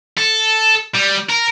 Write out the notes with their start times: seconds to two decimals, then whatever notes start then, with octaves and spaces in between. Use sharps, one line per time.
0.18 A4
0.94 G3
1.29 A#4